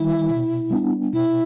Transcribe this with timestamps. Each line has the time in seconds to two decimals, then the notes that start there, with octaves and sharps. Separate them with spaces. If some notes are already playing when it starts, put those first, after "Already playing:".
Already playing: D#3 G3 E4
0.30 B2
0.70 G3 B3 D4
1.13 B2 E4